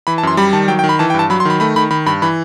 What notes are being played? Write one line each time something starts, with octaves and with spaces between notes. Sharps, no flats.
E3 B5
A5
F#2 C6
G3 B5
D#3 A5
F#3 G5
G5
D#3
B5
E3 A5
G5
G2
A5
F#3 B5
C6
D#3 B5
A3 B5
D#3 B5
D#3 B5
G2 B5
E3 B5